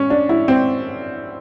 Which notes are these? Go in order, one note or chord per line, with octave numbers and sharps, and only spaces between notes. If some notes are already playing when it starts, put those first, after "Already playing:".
Already playing: C#4
D4
E4
C4